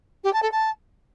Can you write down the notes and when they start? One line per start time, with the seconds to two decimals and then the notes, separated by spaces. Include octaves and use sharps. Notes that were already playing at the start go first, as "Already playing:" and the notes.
0.24 G4
0.33 A5
0.42 A4
0.52 A5